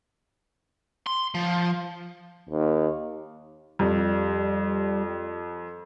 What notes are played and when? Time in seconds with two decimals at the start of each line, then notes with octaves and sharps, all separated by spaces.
1.07 C6
1.35 F3
2.50 D#2
3.79 F2 G3